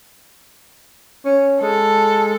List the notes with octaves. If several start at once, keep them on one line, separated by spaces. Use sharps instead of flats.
C#4
G#3 A4